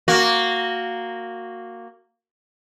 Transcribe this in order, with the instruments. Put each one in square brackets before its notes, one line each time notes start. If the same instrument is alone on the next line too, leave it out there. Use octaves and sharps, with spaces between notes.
[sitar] A#3 F#4